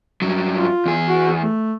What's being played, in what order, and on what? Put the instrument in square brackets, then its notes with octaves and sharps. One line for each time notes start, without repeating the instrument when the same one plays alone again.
[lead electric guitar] G2 F#3
[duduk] F4
[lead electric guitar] E2 G#4
[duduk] F#4
A3